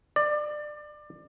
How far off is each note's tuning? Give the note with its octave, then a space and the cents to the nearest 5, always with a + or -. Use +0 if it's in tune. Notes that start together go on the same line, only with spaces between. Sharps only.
D5 +25